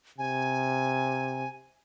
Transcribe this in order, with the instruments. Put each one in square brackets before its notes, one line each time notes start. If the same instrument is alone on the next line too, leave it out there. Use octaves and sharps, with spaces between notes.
[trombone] C3 [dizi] G#5